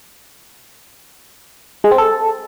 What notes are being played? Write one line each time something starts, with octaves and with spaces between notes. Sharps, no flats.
G#3
C4
A4